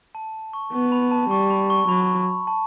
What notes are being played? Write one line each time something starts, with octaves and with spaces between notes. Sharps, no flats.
A5
C#6
B3 C#6
B5
A5
G3 C#6
B5
C#6
F#3 B5
A5